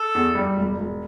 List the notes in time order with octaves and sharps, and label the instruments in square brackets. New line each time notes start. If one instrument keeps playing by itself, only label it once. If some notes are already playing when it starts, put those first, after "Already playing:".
Already playing: [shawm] A4
[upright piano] E2
G3
E1
E1